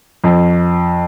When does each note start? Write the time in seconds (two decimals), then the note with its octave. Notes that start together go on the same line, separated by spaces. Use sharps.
0.24 F2